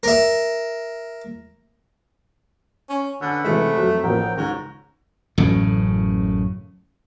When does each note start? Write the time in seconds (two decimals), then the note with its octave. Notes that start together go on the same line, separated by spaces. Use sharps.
0.03 A#4 E5
2.89 C#4
3.21 D3 C#4 B4 F#5 E6
3.44 C3 E3 G#3 A3
3.77 F2 F#3
4.03 A1 F3 A#3 D#4 G5
4.37 C#2 G#2 F#4 A#5
5.38 A1 F#2 A2 C#3